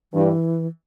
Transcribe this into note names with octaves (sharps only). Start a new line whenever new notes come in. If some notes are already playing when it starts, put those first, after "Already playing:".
G2 E3